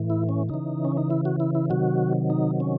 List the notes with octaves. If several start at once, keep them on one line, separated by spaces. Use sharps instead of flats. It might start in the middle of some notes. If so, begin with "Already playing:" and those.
Already playing: A2 E3
E4
C#4
C#3 E3 D#4
C#4
D#4
E4
F#4
E4
E4
C3 D#3 F#3 F#4
D#4
C#4